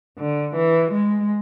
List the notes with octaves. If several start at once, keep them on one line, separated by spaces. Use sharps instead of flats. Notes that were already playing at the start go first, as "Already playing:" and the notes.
D3
E3
G#3